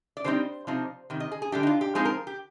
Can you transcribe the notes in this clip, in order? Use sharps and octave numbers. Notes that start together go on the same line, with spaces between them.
D5
D3 G3 C4 D#4 C5
C3 F3 C4 D#4
C3 D#3
D#5
G#4
G#4
D3 G3 D4 G4
D#4
F4
G4
F3 G#3 C4 D#4 G#4
A#4
G4